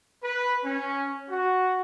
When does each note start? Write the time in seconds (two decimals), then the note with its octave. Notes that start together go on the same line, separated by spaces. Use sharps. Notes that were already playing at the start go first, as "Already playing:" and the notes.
0.23 B4
0.65 C#4
1.29 F#4